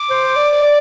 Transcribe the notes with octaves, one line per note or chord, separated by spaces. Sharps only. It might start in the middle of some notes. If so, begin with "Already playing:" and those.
Already playing: D6
C5
D5
D5